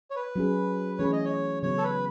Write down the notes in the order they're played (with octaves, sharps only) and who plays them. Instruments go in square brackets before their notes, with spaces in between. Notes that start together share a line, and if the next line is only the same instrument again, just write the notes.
[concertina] C#5
B4
[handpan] F#3 C#4 G#4
[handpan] E3 A3 C#4 G#4 [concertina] C#5
[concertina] D#5
C#5
[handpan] C#3 F#3 B3 [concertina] C#5
[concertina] A4
B4